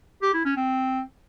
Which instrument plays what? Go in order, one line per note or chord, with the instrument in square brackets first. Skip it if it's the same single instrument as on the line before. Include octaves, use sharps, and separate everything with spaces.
[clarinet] G4
E4
C#4
C4